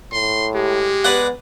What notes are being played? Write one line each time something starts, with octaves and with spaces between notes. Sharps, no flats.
A2 C6
G#3 G4
B3 B4 D5 F#5